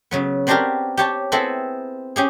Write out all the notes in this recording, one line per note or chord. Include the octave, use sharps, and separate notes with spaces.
C#3 F#3 B3
B3 C4 D4 F#4 G4 A#4
G4 C#5 A5
B3 C4 E4 G#4 A4 B4
C#4 G4 G#4